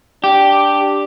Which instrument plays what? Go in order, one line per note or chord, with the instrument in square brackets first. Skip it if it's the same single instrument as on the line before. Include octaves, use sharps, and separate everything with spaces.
[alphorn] D4 [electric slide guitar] G4